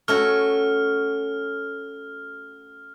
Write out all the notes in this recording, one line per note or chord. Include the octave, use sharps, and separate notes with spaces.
A3 C#4 F#4 F6